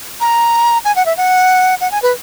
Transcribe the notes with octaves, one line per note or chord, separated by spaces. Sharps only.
A#5
G#5
F#5
E5
F#5
F#5
G#5
B4